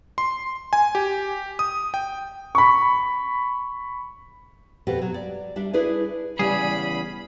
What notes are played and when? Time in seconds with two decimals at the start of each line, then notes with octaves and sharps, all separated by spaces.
0.18 C6
0.73 G#5
0.95 G4
1.59 D#6
1.94 G5
2.55 B5 C#6
4.87 F2 B2 F#4 G4
5.02 F#3
5.14 D5
5.56 G3 D4 E5
5.73 D4 E4 G#4 B4 D5
6.39 E2 C#3 G3 G#4 B5